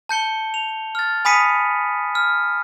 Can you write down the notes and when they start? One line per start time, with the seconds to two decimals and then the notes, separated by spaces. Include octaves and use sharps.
0.09 A5 G6 C#7 G7
0.54 F7
0.95 F6 A6
1.25 G#5 B5 D#6 B6 C#7 D#7
2.15 F6